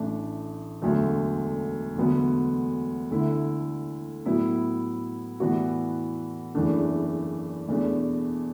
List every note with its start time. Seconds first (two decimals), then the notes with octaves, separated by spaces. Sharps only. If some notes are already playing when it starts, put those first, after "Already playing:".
Already playing: A1 A2 A3 D4
0.82 E1 D2 D3 F#3 A3
1.96 E1 D2 D3 F#3 B3
3.11 D2 D3 A3 E4
4.26 A2 F#3 B3 E4
5.40 A2 E3 B3 F#4 D5
6.55 F#1 E2 E3 A3 D4
7.68 E2 B2 A3 D4